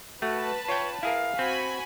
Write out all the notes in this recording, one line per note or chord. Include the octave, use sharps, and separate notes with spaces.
A3 F#4 B4 A5
F4 C#5 G5
E4 G#4 A#4 F5
C4 F#4 G#5 B5